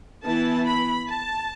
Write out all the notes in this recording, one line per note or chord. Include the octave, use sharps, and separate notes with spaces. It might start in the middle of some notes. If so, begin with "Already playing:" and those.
E3 B3 E4 A5
B5
A5